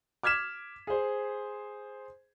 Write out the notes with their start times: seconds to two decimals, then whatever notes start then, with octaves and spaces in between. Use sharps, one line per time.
0.23 D6 F6 G#6 B6 E7
0.87 G#4 C5